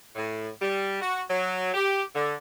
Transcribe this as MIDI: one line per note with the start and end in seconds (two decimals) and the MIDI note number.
0.16 0.49 45
0.60 0.99 55
1.01 1.22 66
1.29 1.69 54
1.74 2.02 67
2.15 2.34 50